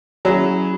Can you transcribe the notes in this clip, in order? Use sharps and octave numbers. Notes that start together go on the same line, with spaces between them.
F#3 C#4 E4 G#4